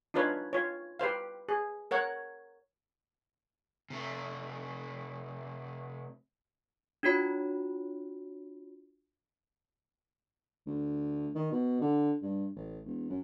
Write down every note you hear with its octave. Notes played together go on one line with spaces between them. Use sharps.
D4 D#4 F4 B4 C#5
F4 C#5
G4 B4 C5 F5
G#4
A#4 C#5 F#5
C3 A3
D4 F4 F#4 C#5 B5
D2
D#3
B2
D3
G2
A1
E1
F#2